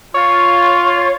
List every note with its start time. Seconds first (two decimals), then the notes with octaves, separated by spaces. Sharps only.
0.14 F4 C#5